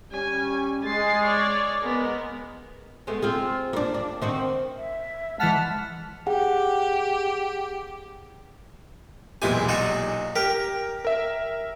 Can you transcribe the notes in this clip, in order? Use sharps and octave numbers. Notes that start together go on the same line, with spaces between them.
G3 C#4 G#5
G#3 A6 C7
C#5 D5
G#3 B3 A#4
G#3 A3 B3
C4 F4 G#4
A#3 D4
D4
D#3 C4 F#4
E5
E3 G#3 F#5 A5 F6 B6
G4 G#4 F#5 G5
B1 E2 A#2 G#3 G4 G#5
D4 D#4 F#4
G4 A#4 F6
A#4 E5